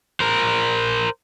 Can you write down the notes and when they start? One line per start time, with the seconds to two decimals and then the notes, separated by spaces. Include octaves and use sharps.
0.20 A#4 C5